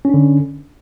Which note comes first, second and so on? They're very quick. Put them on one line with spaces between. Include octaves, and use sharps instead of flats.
C#4 D4 D3